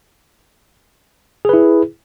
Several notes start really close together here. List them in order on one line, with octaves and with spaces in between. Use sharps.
G#4 B4 E4